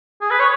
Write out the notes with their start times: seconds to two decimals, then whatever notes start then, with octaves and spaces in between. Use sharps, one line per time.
0.21 G#4
0.30 B4
0.40 C#5